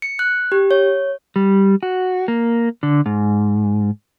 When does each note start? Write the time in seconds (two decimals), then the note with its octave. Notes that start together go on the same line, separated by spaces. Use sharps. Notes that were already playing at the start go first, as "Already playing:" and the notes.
0.02 C#7
0.19 F#6
0.52 G4
0.71 C#5
1.36 G3
1.83 F#4
2.28 A#3
2.83 D3
3.06 G#2